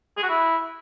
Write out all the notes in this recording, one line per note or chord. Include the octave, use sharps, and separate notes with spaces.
G#4
F#4
E4